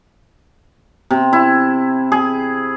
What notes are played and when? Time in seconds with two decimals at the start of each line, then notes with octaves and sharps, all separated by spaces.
1.11 C3
1.33 E4
2.12 G#4